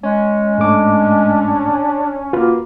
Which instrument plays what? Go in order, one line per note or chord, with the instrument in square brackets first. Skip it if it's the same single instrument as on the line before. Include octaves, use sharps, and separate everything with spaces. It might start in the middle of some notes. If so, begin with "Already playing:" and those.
[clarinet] G#3 [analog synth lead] C#4
[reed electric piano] G#2 A3 D6 [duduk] D4
[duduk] A#3 [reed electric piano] F4 F#4 B4